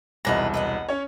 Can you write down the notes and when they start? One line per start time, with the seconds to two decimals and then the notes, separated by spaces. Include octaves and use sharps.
0.25 E1 C2 D#4 B4 A#5 A#6
0.54 B4 D#5 F#5
0.89 C#4 C#5